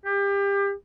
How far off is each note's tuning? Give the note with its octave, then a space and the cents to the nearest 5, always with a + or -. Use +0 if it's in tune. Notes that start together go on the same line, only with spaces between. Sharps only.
G4 +30